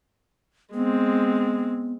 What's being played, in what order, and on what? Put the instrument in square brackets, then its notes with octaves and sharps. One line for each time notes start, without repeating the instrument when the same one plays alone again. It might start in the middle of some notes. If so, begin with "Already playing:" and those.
[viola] G#3 C4 [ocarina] B3